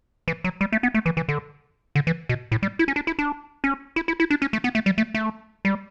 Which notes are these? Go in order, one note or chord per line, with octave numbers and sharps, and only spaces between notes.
E3
F#3
G3
A3
B3
A3
E3
E3
D3
D3
E3
B2
A2
G3
E4
C#4
D4
E4
D4
C#4
E4
E4
E4
D4
C#4
A3
B3
A3
G3
A3
A3
G3